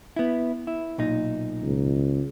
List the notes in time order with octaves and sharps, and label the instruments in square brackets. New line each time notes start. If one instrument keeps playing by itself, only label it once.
[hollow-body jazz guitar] B3 E4
E4
B1 A#2 D#4
[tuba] C#2